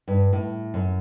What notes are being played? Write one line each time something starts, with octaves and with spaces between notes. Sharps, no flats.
G2
A2
F#2